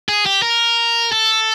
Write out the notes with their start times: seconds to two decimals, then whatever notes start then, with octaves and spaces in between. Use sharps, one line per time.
0.09 G#4
0.26 G4
0.43 A#4
1.12 A4